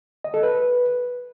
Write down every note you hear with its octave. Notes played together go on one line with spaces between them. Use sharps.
D#5
A4
B4